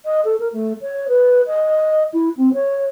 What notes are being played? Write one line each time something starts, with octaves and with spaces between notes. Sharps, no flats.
D#5
A4
A#4
A3
C#5
B4
D#5
E4
C4
C#5